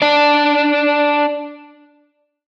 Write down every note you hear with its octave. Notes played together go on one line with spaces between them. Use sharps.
D4 D5